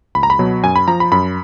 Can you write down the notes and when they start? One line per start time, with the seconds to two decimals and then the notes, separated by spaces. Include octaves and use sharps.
0.15 C#2 B5
0.23 A#5
0.30 B5
0.39 B2 F#3
0.63 F#2 G#5
0.76 B5
0.88 F3 A#5
1.00 B5
1.12 F#2 B5